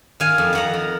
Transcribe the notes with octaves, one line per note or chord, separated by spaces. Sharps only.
D#3 F5 G#5
F2
F2 F#5 A#5
D#3